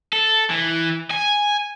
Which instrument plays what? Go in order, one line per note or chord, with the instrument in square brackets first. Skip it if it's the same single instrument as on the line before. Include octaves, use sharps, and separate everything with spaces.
[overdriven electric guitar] A4
E3
G#5